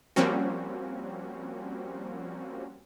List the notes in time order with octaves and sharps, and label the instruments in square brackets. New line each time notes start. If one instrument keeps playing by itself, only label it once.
[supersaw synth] F3 G3 A#3 C4 C#4 F#4